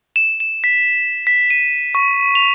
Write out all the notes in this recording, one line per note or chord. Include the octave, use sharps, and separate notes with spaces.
E7
E7
B6
B6
D#7
C#6
F7